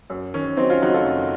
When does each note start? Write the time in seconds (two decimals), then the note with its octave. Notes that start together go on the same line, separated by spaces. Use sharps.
0.10 F#2
0.34 D#3 C#4
0.57 F#3 C4 D#4
0.70 C#4 F4
0.82 F#1 D#4 F#4
0.94 F4 A4
1.06 F#2